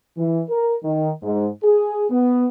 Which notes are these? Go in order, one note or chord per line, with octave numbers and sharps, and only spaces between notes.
E3
A#4
D#3
G#2
G#4
B3